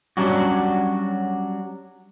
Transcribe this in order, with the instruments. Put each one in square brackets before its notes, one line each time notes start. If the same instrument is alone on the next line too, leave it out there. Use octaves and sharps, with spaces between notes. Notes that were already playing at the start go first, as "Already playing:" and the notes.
[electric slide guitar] F#3 G3 C#4 D4 F#4